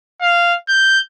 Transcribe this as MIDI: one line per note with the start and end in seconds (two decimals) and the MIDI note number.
0.21 0.55 77
0.69 0.99 91